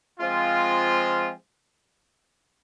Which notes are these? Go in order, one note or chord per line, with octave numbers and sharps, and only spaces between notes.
F3 G#3 C4 F4